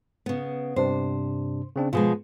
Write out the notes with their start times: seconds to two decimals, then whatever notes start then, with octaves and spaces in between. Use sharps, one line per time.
0.26 C#3 B3
0.76 G2 C3 D4 C5
1.76 C#3 C4 D4
1.93 B2 F3 G#3 F4 G#4